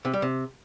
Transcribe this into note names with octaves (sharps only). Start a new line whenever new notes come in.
C3
G3
C3